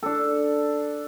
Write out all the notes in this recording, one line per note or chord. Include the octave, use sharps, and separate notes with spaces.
D4 A4